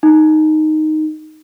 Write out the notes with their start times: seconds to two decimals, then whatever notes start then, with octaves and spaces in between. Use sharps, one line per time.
0.03 D#4